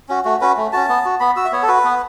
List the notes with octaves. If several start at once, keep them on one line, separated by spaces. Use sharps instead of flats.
C#4 F#4
A3 F#4
C#4 F#4 B4
A3
C#4 F#4 A5
B3
F#4
B3 B5
F#4 E6
E5
B3 C#5
A4
F#4 B4
B3